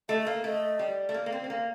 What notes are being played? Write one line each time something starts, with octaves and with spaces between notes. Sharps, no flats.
A3 D#5
D#5
A#3 F5
A3 D#5
G3
A3
A#3
A#3
C4
C4
A#3